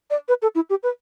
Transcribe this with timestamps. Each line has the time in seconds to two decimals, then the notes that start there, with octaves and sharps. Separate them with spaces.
0.10 D5
0.28 B4
0.42 A4
0.55 E4
0.70 G4
0.83 B4